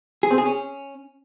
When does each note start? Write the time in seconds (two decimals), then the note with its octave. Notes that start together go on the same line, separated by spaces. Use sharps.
0.23 G#4
0.31 C4
0.38 G#4
0.46 C#4